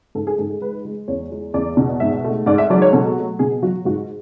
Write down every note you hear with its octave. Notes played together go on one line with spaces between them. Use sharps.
G#2 A4
G#4
G#2 A4
G#4
G#3 B4
G#3
E2 C#5
G#3
E2 D5
B2
G#2 E5
A3
G#2 D5
E5
F#3 D5
C#5
B2 A4
A3
B2 G#4
F#3 F#4
G#2 F#4